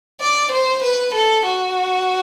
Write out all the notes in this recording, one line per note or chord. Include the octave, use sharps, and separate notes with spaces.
D5
C5
B4
A4
F#4